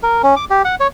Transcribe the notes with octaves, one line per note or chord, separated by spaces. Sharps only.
A#4
C#4
D6
G4
F#5
C#5